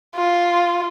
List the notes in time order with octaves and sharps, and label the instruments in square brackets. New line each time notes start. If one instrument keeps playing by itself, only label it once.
[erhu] F4